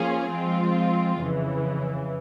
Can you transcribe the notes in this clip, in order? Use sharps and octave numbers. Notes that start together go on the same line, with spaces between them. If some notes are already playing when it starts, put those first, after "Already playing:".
Already playing: F3 A#3 C#4 F4 G#4
F3 G#3 C4 F4
F2 C#3 E3